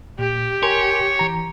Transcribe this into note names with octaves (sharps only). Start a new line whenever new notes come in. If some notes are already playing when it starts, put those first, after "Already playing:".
A#2 G4
A#4 C#5 G#5 C6
E3 A#5